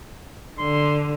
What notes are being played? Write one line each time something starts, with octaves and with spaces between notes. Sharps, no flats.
D3 C6